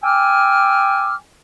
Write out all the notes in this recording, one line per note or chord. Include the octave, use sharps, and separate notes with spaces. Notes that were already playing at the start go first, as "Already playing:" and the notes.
G5 G#5 D6 E6 F6